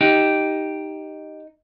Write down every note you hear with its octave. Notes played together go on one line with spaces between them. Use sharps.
D#4 G4